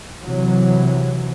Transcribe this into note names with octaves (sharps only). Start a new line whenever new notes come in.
C3 E3 F#3